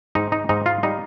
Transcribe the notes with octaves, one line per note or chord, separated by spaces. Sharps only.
G#2 D#4
D#4
G#2 D#4
F4
G3 D#4